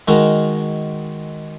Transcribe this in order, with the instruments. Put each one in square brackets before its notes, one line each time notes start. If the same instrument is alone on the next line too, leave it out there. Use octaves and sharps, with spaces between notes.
[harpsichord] D#3 G#3 F#4 A#4